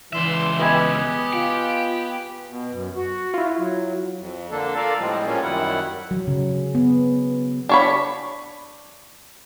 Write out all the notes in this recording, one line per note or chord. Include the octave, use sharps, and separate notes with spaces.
C#2 E3 D5 E5 C6
B3 G4 B4 D#5 G#5
F4 G5
B2
F#2
F#4
E4 F4
F#3
F2
D3 A#3 D4 A4
F4 A4 A#4 D5 F5
A2 F3 G3 G#3 C4
A#2 F3 G3 A#3 C#4 F4
F#2 D#3 G3 E4 F#5
F#3
C#3
B3
D4 C#5 B5